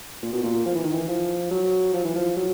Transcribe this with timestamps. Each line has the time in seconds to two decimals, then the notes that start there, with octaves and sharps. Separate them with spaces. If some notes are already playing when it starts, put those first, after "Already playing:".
0.23 A#2
0.33 B2
0.43 A#2
0.66 F3
0.75 E3
0.84 D#3
0.93 E3
1.08 F3
1.51 F#3
1.94 F3
2.05 E3
2.16 F3
2.37 F#3